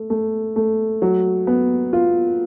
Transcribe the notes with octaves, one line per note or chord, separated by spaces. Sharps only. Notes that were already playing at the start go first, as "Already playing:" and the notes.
Already playing: A3
A3
A3
F#3
B3
F4